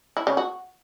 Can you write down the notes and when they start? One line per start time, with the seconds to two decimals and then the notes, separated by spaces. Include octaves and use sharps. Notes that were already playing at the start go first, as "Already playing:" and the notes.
0.17 E4
0.27 C#3
0.37 F#4